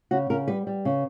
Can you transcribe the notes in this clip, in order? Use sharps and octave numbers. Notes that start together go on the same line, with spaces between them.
C#3 F#4
C#3 A#4
G3 B4
G3
C#3